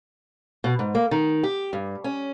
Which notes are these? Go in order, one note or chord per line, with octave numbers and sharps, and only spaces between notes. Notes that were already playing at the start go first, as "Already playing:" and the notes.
B2
G#2
A#3
D#3
G4
G2
C#4